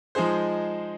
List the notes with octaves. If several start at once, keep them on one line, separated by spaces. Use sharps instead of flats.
F3 G#3 D#4 G#4 C5